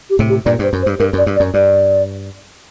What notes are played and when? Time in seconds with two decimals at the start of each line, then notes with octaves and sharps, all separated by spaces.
0.10 G4
0.19 A2 C3
0.29 G4
0.46 G2 A#2 D5
0.59 G2 C5
0.73 F#2
0.82 C5
0.86 G2
0.99 G2 A#4
1.13 F#2
1.18 D5
1.26 G2
1.36 D5
1.40 F#2
1.54 G2 D5